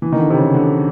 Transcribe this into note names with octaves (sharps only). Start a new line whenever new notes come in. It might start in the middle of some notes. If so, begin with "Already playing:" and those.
E3
D#3
D3
C3
C#3
D3